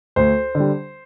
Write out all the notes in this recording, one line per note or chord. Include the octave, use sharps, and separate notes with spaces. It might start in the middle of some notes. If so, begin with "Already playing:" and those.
D2 C5
D3 G3